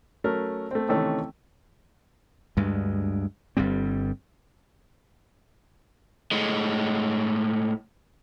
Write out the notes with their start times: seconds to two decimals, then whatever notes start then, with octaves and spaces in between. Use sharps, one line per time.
0.24 F#3 A3 C#4 A#4
0.71 A3 C4
0.89 C3 D#3 E3 A3 C4 C#4
2.57 D2 G2 G#3
3.57 G1 G2 G3 C4
6.32 A2 G#3